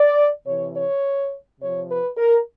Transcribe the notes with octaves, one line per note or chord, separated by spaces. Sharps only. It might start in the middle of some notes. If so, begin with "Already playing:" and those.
Already playing: D5
C3 E3 C#5
C#5
C3 F3 C#5
B4
A#4